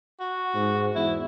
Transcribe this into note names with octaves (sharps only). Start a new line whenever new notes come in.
F#4
G#2
E2 E4